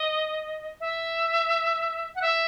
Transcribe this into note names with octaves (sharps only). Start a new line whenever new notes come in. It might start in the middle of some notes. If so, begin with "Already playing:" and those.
Already playing: D#5
E5
F#5
E5